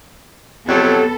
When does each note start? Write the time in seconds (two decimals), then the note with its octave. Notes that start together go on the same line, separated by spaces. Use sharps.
0.68 F2 C3 F#3 B3 A4